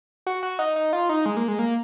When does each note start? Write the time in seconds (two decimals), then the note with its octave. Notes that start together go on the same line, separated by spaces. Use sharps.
0.27 F#4
0.43 F#4
0.59 D#4
0.76 D#4
0.93 F4
1.09 D#4
1.26 G#3
1.37 A#3
1.48 G#3
1.59 A#3